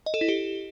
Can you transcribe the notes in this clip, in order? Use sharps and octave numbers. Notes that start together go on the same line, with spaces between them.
D#5
A4
E4
G4